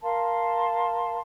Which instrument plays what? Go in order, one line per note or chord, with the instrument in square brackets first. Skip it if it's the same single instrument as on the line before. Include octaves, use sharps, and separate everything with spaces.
[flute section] A#4 F5 A5 C6